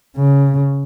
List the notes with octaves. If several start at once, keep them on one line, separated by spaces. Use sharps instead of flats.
C#3